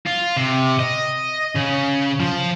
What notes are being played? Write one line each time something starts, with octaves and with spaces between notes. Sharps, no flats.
F4
C3
D#5
C#3
F3